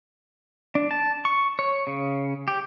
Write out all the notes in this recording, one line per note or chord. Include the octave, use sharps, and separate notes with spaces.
D4
A5
C#6
C#5
C#3
G4